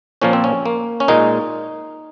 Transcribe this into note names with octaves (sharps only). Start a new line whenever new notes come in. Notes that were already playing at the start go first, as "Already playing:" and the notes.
A#2 F3 A#3 C#4
C4
C#4
A#3
C#4
A#2 G#3 D#4